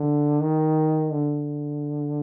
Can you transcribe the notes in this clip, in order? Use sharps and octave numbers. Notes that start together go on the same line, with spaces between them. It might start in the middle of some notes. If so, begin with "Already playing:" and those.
Already playing: D3
D#3
D3